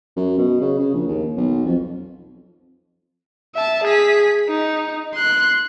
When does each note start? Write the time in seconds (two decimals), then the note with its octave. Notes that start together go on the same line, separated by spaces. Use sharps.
0.16 F#2
0.38 B2
0.61 C#3
0.79 C#3
0.94 A#1
1.08 D#2
1.37 B1
1.65 F2
3.55 E5 A5
3.84 G#4 B6
4.49 D#4
5.14 C6 F#6